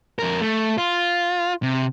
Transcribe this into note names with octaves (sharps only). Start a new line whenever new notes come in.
F2 A#4
A3
F4
C3